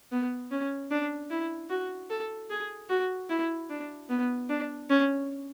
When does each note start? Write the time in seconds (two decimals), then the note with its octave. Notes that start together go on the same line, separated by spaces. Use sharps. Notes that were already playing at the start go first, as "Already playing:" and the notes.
0.12 B3
0.51 C#4
0.91 D4
1.30 E4
1.70 F#4
2.10 A4
2.50 G#4
2.89 F#4
3.30 E4
3.70 D4
4.09 B3
4.49 D4
4.90 C#4